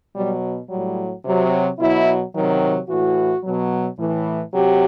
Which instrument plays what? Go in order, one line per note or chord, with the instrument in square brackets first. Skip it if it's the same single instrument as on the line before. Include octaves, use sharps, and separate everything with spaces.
[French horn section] B2 F#3 G3
A2 F#3 G3
C3 F#3
B2 F#3 E4
C3 D#3 F#3
A2 E3 F#4
B2 F#3
A2 E3
C3 F#3 G4